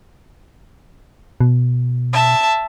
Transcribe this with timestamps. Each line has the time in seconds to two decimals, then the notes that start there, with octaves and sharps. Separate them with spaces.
1.41 B2
2.13 E5 A5